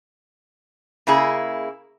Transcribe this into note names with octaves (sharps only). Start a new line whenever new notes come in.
C#3 A#3 E4 G#4